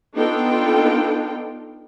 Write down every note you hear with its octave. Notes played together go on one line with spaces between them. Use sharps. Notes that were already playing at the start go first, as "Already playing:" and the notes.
B3 D4 D#4 F4 A4 G5